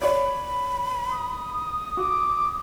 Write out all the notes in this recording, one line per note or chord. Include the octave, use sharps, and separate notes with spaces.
C#5 D5 B5
D#6
F#4 D6